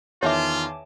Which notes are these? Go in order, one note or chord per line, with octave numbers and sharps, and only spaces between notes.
E2 D#3 F4 C#5 E5 G#5 A5 D6